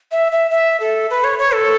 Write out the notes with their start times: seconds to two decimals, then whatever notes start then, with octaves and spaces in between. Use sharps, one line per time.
0.12 E5
0.32 E5
0.51 E5
0.80 A4
1.10 B4
1.24 C#5
1.39 C#5
1.54 A4